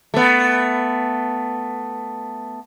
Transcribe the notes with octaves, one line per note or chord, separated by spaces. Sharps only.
A3 B3